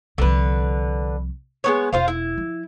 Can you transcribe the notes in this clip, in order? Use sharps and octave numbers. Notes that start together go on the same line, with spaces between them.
C2 D3 F3 B4
G#3 B3 C#5
E1 F4 C5 F5
E4
F3